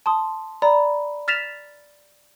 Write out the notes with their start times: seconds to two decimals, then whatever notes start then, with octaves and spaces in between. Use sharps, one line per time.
0.06 A5 C6 D#6
0.62 D5 A#5 B5
1.28 F6 A6 B6 E7 F7